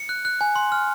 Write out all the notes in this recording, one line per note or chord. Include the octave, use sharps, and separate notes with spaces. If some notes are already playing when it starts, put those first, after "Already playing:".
Already playing: C#7
F#6
F#6
G#5
C6
F6